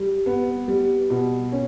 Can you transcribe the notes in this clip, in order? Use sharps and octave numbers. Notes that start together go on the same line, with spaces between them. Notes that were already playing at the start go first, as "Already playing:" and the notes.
Already playing: G3
B3
G3
B2
C#4